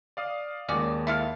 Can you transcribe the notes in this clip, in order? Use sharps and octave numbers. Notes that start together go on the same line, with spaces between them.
D5 F5 D#6
D#2 G#3 C#4 F#4 D5
E4 A4 F5